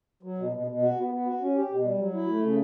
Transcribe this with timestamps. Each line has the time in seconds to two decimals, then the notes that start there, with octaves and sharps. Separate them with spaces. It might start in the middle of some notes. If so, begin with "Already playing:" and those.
0.23 F#3
0.38 B2
0.52 B2
0.67 B2
0.82 F#4
0.97 B3
1.11 B3
1.26 F#4
1.40 C#4
1.55 G4
1.70 B2
1.84 G3
1.98 F#3
2.13 E4
2.28 A3
2.42 C#3